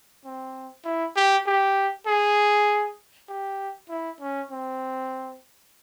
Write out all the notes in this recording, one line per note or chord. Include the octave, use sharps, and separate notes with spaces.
C4
E4
G4
G4
G#4
G4
E4
C#4
C4